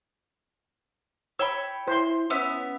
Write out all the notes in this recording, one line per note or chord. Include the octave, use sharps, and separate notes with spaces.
C#5 G5 B5 E6
E4 C5 C6
B3 C#4 E5